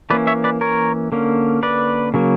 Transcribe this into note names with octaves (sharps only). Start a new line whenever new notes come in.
E3 A#3 C#4 B4 D5
C#5 E5
B4 D5
A#4 C#5
D3 A#3 C#4
B4 D5
C#3 F#3 A#3